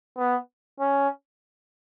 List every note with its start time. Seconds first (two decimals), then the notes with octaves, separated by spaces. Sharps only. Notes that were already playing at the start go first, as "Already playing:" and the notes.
0.17 B3
0.80 C#4